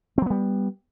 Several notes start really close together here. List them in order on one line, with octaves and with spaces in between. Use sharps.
C4 F#3 B3 G3